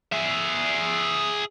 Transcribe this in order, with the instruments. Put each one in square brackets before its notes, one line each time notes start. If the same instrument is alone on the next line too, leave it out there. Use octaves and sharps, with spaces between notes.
[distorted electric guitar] G#4 E5